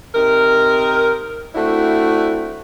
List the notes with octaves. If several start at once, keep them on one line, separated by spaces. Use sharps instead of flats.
C3 D#4 A#4
A3 C4 D4 E4 F#4